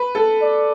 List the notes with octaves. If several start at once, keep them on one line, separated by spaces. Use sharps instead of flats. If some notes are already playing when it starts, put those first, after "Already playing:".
Already playing: B4
A4
D5